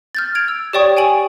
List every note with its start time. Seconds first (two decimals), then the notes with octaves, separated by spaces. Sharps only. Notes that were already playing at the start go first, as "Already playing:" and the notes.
0.15 F6 G6 A6
0.35 G#6 D7 F7
0.48 E6
0.73 G4 C#5 D5 G5 C#6 D#6
0.97 G5 G#5 D7 F#7